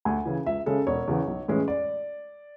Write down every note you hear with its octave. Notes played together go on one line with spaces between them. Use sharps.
D2 G#5
C#3 E3
C#2 E5
C#3 G#3 C#4 A4
E1 C#5
E2 C#3 E3
B1
A2 E3 G#3 C#4
D5